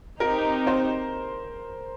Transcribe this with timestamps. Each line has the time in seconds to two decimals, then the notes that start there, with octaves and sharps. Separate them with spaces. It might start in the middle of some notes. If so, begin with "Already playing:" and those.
0.20 C4 D#4 G4 A#4
0.67 C5